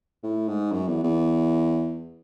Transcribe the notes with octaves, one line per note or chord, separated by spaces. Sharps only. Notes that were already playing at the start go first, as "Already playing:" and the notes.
A2
G#2
F#2
E2
E2